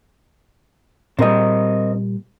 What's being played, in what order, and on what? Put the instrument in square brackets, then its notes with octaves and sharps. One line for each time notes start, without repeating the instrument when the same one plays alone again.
[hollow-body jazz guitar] A#2 G3 [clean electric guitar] C4 A#4 D#5